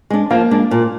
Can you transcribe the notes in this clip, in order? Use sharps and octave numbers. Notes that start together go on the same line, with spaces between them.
G#3 D4
F3 A#3
G#3 D4
A#2